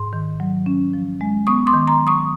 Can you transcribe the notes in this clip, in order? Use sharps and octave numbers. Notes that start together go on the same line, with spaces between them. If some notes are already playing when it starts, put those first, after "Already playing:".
Already playing: G#2 C6
D#3
F#3
C#4
F3
G#3
B3 C#6 D#6
C6 D6
D#3
A#5 C6
F#3
C#6 D#6